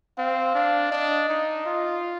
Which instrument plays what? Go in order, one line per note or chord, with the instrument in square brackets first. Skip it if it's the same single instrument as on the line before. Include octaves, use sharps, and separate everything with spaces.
[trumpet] C4 [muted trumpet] F5
[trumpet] D4
[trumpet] D4 [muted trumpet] D#5
[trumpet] D#4
F4